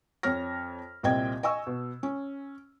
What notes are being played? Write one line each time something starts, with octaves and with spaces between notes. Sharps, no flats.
F2 C#5 F6 A#6
C2 A#2 C4 D#5 G5 G#6
D#5 G#5 C#6 E6
B2
C#4